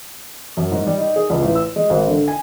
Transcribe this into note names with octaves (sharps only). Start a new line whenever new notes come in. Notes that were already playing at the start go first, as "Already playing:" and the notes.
F#2
G#2
G3
D#4
G#4
C#2
A1
E6
G#3
G#1
D3
G#5